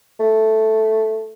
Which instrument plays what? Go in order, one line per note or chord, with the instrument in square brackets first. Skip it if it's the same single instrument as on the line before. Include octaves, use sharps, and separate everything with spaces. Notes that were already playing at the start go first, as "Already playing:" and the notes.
[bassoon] A3